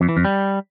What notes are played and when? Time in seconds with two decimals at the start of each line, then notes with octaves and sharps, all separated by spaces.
0.01 F2
0.09 E3
0.17 F2
0.25 G3